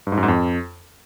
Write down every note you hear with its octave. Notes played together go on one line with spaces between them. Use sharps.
G2
G#2
F#2
G#2
F2